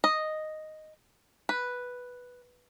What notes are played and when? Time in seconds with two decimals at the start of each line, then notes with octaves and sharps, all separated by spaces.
0.04 D#5
1.49 B4